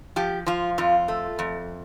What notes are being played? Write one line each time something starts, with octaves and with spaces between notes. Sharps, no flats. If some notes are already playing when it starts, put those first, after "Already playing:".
F3 G4
F3 F4
F2 F4
A3
F2